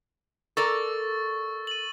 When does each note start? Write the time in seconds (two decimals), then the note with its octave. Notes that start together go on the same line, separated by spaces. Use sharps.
0.57 A4 A#4 D5 C#6 E6 A6
1.67 D#7 F#7